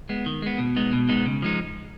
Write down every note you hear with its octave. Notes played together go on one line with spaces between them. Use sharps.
G#3 B3
D#3
G#3 B3
B2
G#3 B3 D#4
B2
G#3 B3 D#4
C#3
F3 G#3 D#4